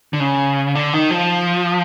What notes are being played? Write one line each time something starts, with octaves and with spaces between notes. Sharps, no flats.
D3
C#3
D3
D#3
F3